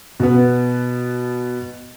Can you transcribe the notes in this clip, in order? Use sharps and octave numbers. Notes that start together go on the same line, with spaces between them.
B2 B3